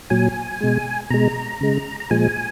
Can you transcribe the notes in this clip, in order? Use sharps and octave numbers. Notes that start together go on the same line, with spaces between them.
A#2 F#3 G#5
B2 G#3
B2 G#3 A#5
C#3 G#3
A#5
A#2 F3 G#3 G#5